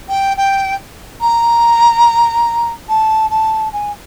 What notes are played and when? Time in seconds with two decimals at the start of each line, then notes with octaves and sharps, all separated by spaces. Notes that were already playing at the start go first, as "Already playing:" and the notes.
0.09 G5
0.37 G5
1.21 A#5
2.89 A5
3.30 A5
3.72 G#5